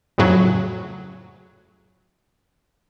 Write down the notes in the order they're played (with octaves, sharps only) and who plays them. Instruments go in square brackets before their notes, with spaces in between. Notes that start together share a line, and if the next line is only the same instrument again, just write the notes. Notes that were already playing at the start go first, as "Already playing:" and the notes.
[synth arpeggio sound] F2 A2 C#3 F#3